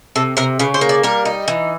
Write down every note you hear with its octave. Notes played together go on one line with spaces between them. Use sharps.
C3 A4
C3 A#4
C#3 B4
C5
A#3
D5
G3 A#4
D#4
E3